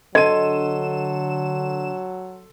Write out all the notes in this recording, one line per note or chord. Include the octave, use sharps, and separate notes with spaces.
D3 F#3 A4 D#5 C6 D#7 E7